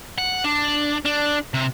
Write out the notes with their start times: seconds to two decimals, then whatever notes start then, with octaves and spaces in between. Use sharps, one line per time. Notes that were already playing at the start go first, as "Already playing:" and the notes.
0.18 F#5
0.45 D4
1.06 D4
1.54 C3